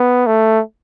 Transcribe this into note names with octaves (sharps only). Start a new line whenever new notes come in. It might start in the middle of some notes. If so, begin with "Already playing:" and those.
Already playing: B3
A3